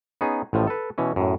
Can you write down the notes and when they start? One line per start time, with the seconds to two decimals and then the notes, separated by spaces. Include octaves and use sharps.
0.21 B3 C#4 D#4 G#4
0.53 A1 A2 F3
0.67 A4 B4
0.98 B2 E3 C#4
1.16 F#2 A2